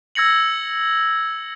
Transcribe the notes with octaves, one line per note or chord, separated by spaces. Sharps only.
E6 G#6 A#6 C#7 F#7